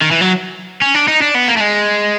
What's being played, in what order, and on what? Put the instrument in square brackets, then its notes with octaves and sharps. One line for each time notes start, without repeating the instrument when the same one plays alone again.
[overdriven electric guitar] D#3
E3
F#3
C#4
D4
D#4
D4
B3
A#3
A3
G#3